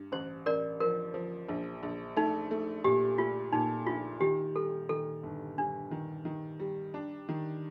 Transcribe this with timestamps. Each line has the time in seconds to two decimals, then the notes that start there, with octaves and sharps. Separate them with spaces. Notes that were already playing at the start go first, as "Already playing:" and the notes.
Already playing: G2
0.12 A1 C5
0.46 A1 A#4 D5
0.80 F3 A#4
1.14 F3
1.49 A#1
1.83 A#1
2.16 A3 D#4
2.51 A3
2.84 A#2 G4
3.18 A3 F4
3.52 A#2 D#4
3.86 A#1 F4
4.21 D#3 G4
4.55 G3 A4
4.89 D#3 A4
5.23 G1
5.58 G3 D4
5.91 D#3
6.25 D#3
6.60 G3
6.94 D4
7.29 D#3